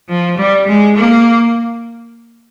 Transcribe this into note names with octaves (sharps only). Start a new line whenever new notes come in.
F3
G3
G#3
A#3